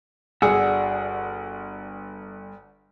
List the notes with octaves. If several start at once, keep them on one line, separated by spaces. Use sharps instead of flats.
G1 D4 F#4 G#4 F#5 E6